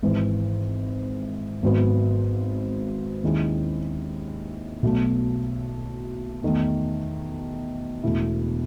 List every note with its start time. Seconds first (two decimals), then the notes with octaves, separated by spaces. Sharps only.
0.02 G#1 G#2 E3
1.63 G#1 G#2 F#3 B3
3.23 D#2 D#3 G#3 C#4 E4
4.82 B1 B2 F#3 A3
6.43 E2 D#3 A3
8.03 E1 E2 B2 A3 E4